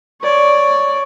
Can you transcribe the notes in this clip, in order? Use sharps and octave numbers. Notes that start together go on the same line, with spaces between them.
C#5 D5